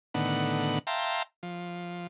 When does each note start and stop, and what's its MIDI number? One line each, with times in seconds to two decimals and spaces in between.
0.14 0.79 45
0.14 0.79 50
0.14 0.79 51
0.14 0.79 59
0.14 0.79 78
0.87 1.23 76
0.87 1.23 77
0.87 1.23 79
0.87 1.23 81
0.87 1.23 82
0.87 1.23 84
1.43 2.07 53